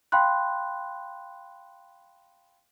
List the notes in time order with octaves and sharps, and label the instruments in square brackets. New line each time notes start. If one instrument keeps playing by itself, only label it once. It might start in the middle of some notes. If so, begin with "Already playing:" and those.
[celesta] F5 G5 B5 C6 F#6